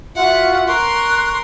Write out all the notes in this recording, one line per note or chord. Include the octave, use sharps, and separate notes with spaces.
F4 F#4 E5 F#5
A#4 C6 C#6 F#6